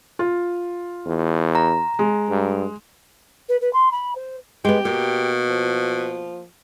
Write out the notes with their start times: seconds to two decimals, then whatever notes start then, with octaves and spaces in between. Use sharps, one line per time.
0.19 F4
1.06 E2
1.55 A#5
1.99 G#3
2.30 G2
3.49 B4
3.61 B4
3.73 C6
3.92 B5
4.15 C5
4.65 G#3 B3 G4
4.85 B2 A#3
5.49 F3